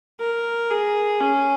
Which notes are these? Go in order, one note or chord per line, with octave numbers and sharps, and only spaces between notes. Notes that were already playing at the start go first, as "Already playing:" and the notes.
A#4
G#4
C#4